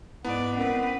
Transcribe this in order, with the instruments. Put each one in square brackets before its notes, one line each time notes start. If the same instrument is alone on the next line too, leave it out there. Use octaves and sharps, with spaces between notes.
[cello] G#2 D5 [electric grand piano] B3 [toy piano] E4 [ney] F#5
[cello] C4 B4 [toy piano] C#4 A#4